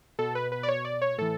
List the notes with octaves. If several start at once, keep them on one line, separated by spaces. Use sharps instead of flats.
B2 A4
B4
B4
D5
C#5
D5
C#5
A2 E3 A4